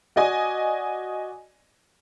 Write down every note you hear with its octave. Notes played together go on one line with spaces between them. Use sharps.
F#4 D5 D#5 G#5